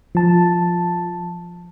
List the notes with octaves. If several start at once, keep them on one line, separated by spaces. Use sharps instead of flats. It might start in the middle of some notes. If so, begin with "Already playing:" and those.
F3 A5